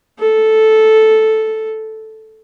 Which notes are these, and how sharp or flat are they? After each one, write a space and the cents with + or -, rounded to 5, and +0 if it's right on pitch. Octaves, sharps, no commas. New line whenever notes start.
A4 -5